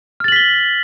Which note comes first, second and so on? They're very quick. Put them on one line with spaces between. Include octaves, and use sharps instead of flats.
F6 A6 F#7 B6 G7